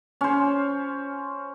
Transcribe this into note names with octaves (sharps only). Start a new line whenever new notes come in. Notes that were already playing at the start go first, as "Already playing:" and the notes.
C#4 C5